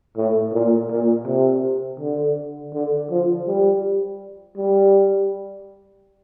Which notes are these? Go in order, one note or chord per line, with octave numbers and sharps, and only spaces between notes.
A2
A#2
A#2
C3
D3
D3
F3
G3
G3